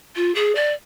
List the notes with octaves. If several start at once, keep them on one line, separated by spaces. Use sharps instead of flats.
F4
G#4
D5